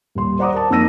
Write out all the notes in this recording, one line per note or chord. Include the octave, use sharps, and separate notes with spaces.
D#1 C6
C5 D5 F#5 A#5 D6 D#6
A#4 A5
F2 A#3 D#4 E6 A#6 D#7